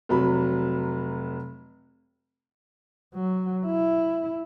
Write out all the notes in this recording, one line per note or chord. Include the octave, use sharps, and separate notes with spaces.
F1 F#3 B5
F#3
E4